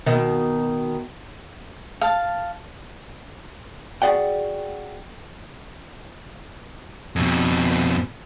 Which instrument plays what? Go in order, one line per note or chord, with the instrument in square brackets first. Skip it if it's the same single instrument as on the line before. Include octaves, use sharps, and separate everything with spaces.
[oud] B2 D#3
[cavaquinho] F5 A5
[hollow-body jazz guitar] F#4 G#4 D5 F#5 G5
[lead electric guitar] F2 B2